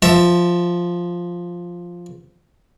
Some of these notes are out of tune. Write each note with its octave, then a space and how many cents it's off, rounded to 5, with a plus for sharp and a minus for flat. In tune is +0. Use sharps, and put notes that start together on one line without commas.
F3 +0 E5 +0 A5 +20